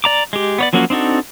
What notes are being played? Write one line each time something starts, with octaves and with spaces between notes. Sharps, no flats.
D5 A#5 D6
G#3 G4
B3 C#5 D5
F3 F#3 A#3 C#4 F#4
C4 D4 D#4 F#4 A4